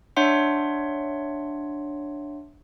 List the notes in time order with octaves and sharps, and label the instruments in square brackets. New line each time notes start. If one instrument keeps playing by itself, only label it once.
[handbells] D4 C#5 E5 F#5 C6